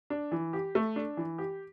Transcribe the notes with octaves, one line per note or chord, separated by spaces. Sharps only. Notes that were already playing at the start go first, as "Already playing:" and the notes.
D4
E3
G4
A3
D4
E3
G4